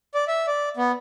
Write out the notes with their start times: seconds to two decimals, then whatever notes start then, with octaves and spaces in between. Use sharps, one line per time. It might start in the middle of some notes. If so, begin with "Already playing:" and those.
0.14 D5
0.28 E5
0.47 D5
0.77 B3